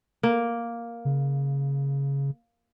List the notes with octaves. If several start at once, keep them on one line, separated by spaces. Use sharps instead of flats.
A#3
C#3